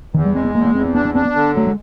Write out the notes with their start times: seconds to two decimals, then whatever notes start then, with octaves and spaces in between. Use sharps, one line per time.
0.14 E2 D#3
0.25 G3
0.35 G#3 C4
0.45 B3
0.55 E2 A#3
0.65 A#3
0.75 E2 C4
0.85 C4
0.95 B3 D4
1.05 B3
1.14 C4 D4
1.25 B3
1.35 D3
1.55 F#3 A3
1.67 G#3